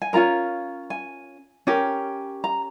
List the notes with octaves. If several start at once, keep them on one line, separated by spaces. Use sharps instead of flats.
G#5
C#4 F4 A#4 A#5
G#5
C#4 G4 A#4
A#5